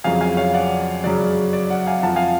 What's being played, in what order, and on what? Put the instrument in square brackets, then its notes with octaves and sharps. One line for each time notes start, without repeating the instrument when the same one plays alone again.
[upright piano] F2 C#3 F#3 F5 G#5
F5 G#5
C#5 F5
D5 F#5
F#2 C#3 F#3 D5
D5
D5 F#5
F5 G#5
F2 F3 F#5 A5
F5 G#5